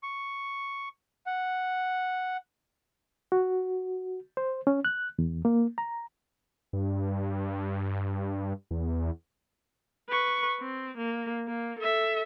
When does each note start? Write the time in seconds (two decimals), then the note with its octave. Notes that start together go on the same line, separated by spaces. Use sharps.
0.03 C#6
1.26 F#5
3.32 F#4
4.37 C5
4.67 C#4
4.85 F#6
5.19 E2
5.45 A#3
5.78 A#5
6.73 G2
8.71 E2
10.09 B4 C#6
10.60 C4
10.97 A#3
11.47 A#3
11.79 A4 E5